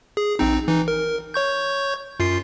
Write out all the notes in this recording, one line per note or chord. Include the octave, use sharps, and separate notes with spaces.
G#4
A#1 C4 D#4
E3 D#4
A#4
C#5 C#6 G6
F#2 F4 C7